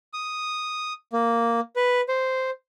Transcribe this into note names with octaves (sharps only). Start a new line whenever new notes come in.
D#6
A#3
B4
C5